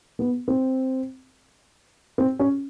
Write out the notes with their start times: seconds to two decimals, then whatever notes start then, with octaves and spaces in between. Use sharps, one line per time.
0.19 B3
0.48 C4
2.18 C4
2.39 C#4